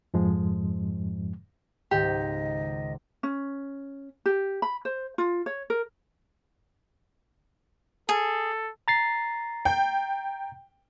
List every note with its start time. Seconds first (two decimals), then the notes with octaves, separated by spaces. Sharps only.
0.14 F2 G#2 F3 G#3
1.91 C#2 G#2 D#3 G4 D#5
3.23 C#4
4.26 G4
4.62 B5
4.85 C5
5.18 F4
5.46 C#5
5.70 A#4
8.09 G#4 A4
8.88 A#5 A6 C7
9.65 G5